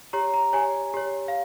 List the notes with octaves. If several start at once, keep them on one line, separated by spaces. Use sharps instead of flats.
G4 C#5 A#5
A#5
G4 C#5 G#5
G4 C#5
F5